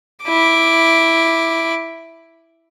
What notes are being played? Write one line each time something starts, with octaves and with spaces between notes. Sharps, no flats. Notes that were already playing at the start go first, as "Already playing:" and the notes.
E4 D6